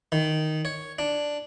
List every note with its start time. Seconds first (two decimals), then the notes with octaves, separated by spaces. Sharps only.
0.12 D#3
0.65 C#5
0.99 D4